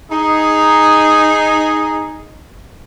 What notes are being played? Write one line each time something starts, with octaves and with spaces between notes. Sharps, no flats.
D#4 G#4